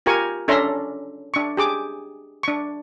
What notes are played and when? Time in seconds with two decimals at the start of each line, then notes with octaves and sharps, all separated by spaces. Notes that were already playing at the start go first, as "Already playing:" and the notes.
0.06 F4 G4 A#4 G#5 C#6
0.48 C#4 D4 A4 E5 A#5 C6
1.34 D4 C#6
1.57 G4 G#4 D6
2.43 D4 C#6